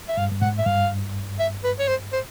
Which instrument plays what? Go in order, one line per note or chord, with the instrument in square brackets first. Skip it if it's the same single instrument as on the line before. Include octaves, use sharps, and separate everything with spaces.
[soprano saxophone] E5
[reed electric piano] G2 [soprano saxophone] F5
[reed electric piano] G2
[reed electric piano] G#2 [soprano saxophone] F#5
[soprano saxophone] E5
[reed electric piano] G2 [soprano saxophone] F5
[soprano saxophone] E5
B4
C#5
C5
C5